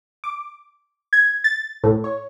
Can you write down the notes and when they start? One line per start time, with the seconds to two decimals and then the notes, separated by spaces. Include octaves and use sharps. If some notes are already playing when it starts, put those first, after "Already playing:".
0.24 D6
1.13 G#6
1.44 A6
1.84 A2
2.04 C#5